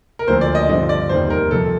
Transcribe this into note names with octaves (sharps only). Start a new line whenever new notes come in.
A#4
D2 D3 F3 A#3 C5
D5
D#5
G2 D3 F3 C4 D#5
D5
F1 D#2 D#3 G3 C5
A#4
F2 C3 A4